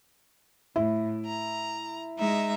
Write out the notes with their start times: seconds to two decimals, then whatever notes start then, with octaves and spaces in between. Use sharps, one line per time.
0.76 A2 E4
1.25 A#5
2.18 G#3 D#4 E5